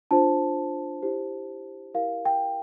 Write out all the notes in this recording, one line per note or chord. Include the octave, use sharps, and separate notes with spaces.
D4 F4 C5 A5
E4 G4 C5
E4 G4 A#4 F5
G5